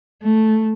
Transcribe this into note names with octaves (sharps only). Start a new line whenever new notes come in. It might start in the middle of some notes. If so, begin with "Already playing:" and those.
A3